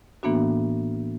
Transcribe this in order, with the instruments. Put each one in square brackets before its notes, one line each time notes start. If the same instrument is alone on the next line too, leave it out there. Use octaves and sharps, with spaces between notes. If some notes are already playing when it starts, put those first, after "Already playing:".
[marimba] A2 E3 A#3 B3 D4 F#4